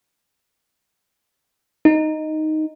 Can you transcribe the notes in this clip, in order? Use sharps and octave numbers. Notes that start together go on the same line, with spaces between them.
D#4